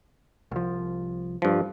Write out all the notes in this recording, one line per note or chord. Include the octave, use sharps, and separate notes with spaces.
C2 F3
G2 F3